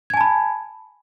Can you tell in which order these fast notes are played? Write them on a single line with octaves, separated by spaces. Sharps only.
G#6 G#5 A5 B5